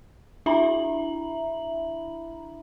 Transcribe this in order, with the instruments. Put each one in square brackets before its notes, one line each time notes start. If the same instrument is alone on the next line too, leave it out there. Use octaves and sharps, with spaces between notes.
[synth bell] D4 E4 E5 A#5 B5 F#7